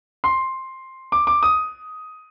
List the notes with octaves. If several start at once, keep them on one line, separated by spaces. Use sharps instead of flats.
C6
D6
D6
D#6